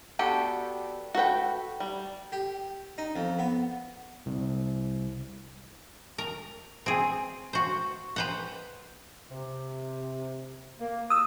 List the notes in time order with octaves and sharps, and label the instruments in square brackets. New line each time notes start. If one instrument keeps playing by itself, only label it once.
[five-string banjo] B3 D4 F#4 G4 A4
F#4 A4 B4 G5
G3
[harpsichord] G4
D#4
F2
B3
[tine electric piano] C2
[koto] A#4
C4 G#4
F#4 C5
B4 C5 F#5
[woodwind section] C3
A#3
[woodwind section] A#2 F#4 [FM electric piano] D#6 E6